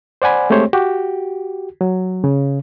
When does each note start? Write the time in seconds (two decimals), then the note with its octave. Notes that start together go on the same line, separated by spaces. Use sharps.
0.22 C5 D5 F#5 G#5 B5
0.50 G#3 A3 C4 G4 C5 C#5
0.73 F#4 G4
1.81 F#3
2.24 C#3